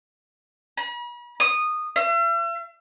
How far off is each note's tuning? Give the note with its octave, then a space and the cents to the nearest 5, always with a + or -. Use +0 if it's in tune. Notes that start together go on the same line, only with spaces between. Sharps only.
B5 -45
D#6 -15
E5 +45